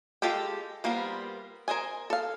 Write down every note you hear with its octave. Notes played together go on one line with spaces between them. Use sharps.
G#3 F4 G4 A4 G5
G3 A#3 B3 F4 C5
A#4 C5 D#5 G#5
A4 F5